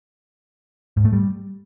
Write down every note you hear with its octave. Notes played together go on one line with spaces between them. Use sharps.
G#2
A3
G3